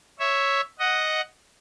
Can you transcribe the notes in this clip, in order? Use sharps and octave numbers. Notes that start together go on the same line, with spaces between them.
C#5 E5
D#5 F#5